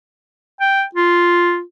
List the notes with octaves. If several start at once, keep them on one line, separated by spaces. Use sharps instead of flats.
G5
F4